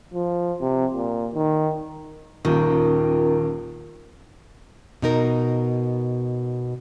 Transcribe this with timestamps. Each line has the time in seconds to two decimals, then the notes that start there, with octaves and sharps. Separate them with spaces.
0.14 F3
0.61 C3
0.94 A#2
1.35 D#3
2.45 D#1 D#2 D#3 C#4 F4 A#4
5.02 B2 D#4 A#4